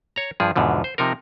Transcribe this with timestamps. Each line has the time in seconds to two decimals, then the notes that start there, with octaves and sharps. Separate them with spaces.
0.16 C#5 A#5
0.40 G2 F3 G#4
0.56 E2 G#2 B2 D3 F3
0.84 C5
0.98 C3 F3 D#4 A#4